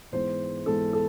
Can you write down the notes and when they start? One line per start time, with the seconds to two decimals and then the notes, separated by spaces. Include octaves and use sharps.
0.12 G#2 E3 G#3 B3 C5
0.66 G#2 E3 G#3 B3 A4
0.93 A4